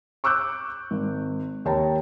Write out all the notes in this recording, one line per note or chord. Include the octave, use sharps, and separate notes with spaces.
C#6 D6 E6 F#6 G6
G#1
D#2 C#5 G5 A5 A#5